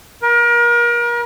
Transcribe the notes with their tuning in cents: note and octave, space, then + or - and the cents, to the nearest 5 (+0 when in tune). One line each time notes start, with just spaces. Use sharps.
A#4 +35